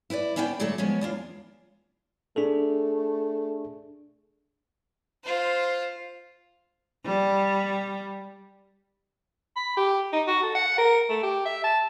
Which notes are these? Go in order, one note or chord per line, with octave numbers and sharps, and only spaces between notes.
E4 B4 C5 D5
B3 C#4 D4 B4 E5 G5
D3 F#3 G3 A3 D4 A4
F3 G#3 B3 C#4
E2 D4 F4
A3 D4 G#4 A4
F4 C5
G3
B5
G4
D#4
F#4
A4
F#5
A#4
A3
G4
E5
A5